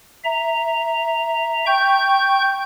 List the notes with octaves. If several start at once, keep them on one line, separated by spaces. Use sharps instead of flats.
E5 A#5
G5 C#6 G6